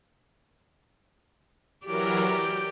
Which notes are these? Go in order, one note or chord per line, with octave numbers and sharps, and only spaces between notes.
E3 F#3 G4 A#4 D5
G6 D7